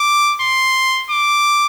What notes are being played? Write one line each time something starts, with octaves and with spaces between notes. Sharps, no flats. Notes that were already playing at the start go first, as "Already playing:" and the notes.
Already playing: D6
C6
D6